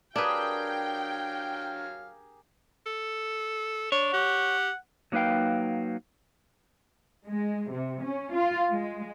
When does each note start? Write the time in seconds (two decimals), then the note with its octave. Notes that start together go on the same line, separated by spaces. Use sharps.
0.16 F#3 D4 G4 G#4 A#4 B4 F5 G5
2.86 A4
3.92 D4 C#5
4.13 G4 F#5
5.12 F#3 A#3 D#4 B4 F5 G5
7.27 G#3
7.73 C3
8.03 C#4
8.35 F4
8.71 G#3